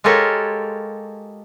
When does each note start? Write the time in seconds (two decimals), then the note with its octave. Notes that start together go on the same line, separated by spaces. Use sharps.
0.04 G#3 F4 G4 A4 A#4 C#5